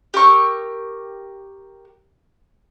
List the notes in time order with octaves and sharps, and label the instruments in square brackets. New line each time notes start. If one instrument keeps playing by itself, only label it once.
[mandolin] G4 A#4 C#6 E6